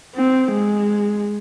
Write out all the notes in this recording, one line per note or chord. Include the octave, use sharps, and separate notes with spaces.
C4
G#3